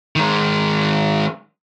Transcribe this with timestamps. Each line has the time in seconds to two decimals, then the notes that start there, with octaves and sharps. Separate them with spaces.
0.16 D#3 G#3